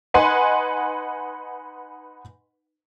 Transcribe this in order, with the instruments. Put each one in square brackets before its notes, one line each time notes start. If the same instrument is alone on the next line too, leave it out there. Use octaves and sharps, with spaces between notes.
[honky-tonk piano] D#4 B4 F#5 G#5 C6